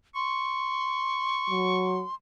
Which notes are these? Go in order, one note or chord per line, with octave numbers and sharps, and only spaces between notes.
C6 C#6
F#3